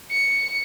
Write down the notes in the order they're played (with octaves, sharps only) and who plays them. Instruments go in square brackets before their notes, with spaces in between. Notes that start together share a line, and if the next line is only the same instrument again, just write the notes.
[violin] C#7